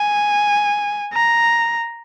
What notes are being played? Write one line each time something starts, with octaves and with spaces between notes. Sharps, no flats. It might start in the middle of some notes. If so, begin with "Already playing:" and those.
Already playing: G#5
A#5